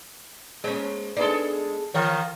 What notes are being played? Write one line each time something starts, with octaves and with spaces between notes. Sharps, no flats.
G#3 A#3 C#4
G#3 B3 D4 D#4 G#4 A4
D#3 E3 F4 C#5